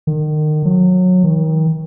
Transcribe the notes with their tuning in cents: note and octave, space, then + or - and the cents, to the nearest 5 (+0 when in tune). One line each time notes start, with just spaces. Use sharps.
D#3 -30
F#3 -20
D#3 +30